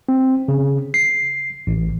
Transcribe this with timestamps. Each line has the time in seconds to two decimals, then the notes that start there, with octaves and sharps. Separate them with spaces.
0.09 C4
0.48 C#3
0.94 C7
1.67 A1